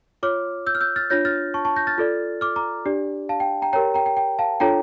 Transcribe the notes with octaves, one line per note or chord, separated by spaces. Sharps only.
F4 C#5 D6 F6
E6 G6
F6
E6 G6
F6 A6
D4 F4 C#5 G6 A#6
F6 A6
A5 C#6
A5 C#6
G6 A#6
F6 A6
F4 A4 D5
D6 F6
A#5 D6
D4 G4 D5
F5 A5
G5
G5 A#5
G4 A#4 C#5 G5 A#5
G5 A#5
G5
G5
F5 A5
D4 F4 A4 C#5 G5 A#5